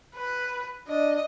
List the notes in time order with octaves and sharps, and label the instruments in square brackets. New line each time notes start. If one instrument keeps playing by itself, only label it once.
[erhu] B4
[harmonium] D4 [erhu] D#5